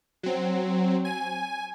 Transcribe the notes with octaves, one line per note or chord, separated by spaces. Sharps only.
F#3 C4
G#5